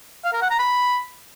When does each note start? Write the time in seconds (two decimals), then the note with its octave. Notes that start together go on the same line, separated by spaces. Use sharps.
0.24 F5
0.33 A#4
0.42 F#5
0.50 A#5
0.59 B5